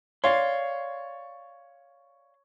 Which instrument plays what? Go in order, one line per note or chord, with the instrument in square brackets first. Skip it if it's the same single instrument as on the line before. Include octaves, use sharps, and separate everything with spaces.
[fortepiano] C#5 [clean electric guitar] D5 F5 C6